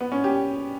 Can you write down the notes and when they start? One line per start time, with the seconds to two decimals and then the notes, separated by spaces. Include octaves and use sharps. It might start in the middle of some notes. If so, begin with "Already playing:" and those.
0.01 B3
0.12 C#4
0.24 G4